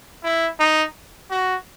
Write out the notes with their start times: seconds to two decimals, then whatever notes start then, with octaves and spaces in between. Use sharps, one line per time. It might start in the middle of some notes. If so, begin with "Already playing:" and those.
0.24 E4
0.60 D#4
1.31 F#4